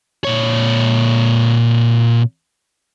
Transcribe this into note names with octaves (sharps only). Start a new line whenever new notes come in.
A#2 C#5